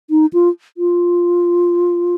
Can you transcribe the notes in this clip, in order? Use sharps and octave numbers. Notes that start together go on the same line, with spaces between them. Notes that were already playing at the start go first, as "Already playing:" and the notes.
D#4
F4
F4